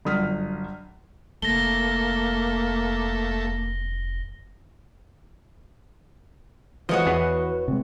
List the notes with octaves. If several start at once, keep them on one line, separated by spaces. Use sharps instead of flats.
G1 F#2 D#6 F6 B6
F1 A3 A#3 A#6 G7
E3 F3 G#3 F#4 B4 C#5 D#5
E2 B3 G#4
C3 G#3